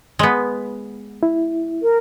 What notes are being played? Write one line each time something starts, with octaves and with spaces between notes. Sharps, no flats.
G#3 B3
E4
A#4